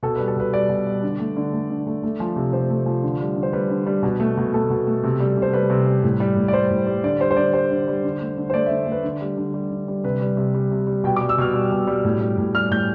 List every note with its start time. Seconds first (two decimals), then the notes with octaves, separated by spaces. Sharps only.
0.03 B2 A4
0.16 G3 B4
0.28 A4
0.36 B2 B4
0.53 G3 D5
0.69 B2
0.87 G3
1.03 D3
1.19 A3
1.37 D3
1.53 A3
1.70 D3
1.87 A3
2.03 A3
2.20 F3
2.36 C3
2.53 C3 C5
2.70 A3
2.86 F3
3.03 D3
3.20 G3
3.36 D3
3.43 C5
3.53 G3 B4
3.70 D3
3.86 G3
4.03 B2
4.20 A3
4.37 B2
4.54 A3 A4
4.70 B2
4.87 A3
5.04 C3
5.20 G3
5.37 C3 C5
5.53 G3 B4
5.70 C3
5.87 G3
6.03 A2
6.20 G3
6.36 A2
6.48 D5
6.53 G3 C5
6.71 A2
6.87 G3
7.03 D3 D5
7.20 G3 C5
7.31 C5
7.37 D3 D5
7.53 G3 C5
7.71 D3
7.88 G3
8.04 D3
8.21 A3
8.38 D3
8.50 C5
8.54 A3 D5
8.66 D3 E5
8.87 A3
8.92 B4
9.04 D3
9.21 G3
9.37 D3
9.54 G3
9.71 D3
9.88 G3
10.04 C3 B4
10.21 G3
10.37 C3
10.54 G3
10.71 C3
10.87 G3
11.04 B2 G5
11.16 G3 D6
11.29 E6
11.38 B2 F6
11.54 G3
11.72 B2
11.87 G3
12.05 A2
12.21 G3
12.38 A2
12.55 G3 F6
12.71 A2 G6